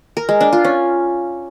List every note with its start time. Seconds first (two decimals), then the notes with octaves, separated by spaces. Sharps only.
0.17 A#4
0.29 G#3
0.41 D4
0.53 F4
0.65 C#4